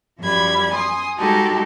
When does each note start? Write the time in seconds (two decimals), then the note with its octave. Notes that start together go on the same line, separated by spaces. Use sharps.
0.20 F#2 F3 G3 B5 G#6
0.71 G#5 C6 D#6
1.18 G#3 D#4 F#4 G4 A4